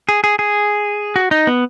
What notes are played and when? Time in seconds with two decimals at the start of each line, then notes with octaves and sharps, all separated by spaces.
0.09 G#4
0.24 G#4
0.39 G#4
1.16 F#4
1.31 D#4
1.47 B3